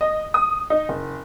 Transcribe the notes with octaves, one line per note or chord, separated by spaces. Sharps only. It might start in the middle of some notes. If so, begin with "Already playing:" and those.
D#5
D#6
D#4
F#1